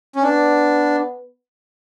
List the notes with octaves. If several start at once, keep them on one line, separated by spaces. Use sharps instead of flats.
C#4
B3 D4